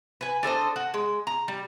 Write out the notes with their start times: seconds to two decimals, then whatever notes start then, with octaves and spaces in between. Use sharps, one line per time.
0.21 B4 G#5
0.43 D4 A4 C5 D#5
0.76 F#4
0.94 G#3
1.27 A#5
1.48 G3